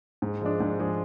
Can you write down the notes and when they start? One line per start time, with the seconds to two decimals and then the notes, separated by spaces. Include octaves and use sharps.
0.22 G#2
0.41 F3 G#3 D4
0.60 G#2
0.79 F3 G#3 D4